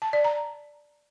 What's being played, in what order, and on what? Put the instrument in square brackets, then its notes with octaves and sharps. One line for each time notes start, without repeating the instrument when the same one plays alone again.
[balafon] A5
D5
A#5